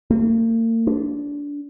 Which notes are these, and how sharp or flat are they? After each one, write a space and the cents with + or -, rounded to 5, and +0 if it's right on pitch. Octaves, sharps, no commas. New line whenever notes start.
A#3 -45
D4 -20